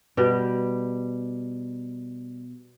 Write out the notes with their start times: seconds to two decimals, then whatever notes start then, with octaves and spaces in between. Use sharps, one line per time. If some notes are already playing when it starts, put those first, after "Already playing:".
0.17 B2 G3 G4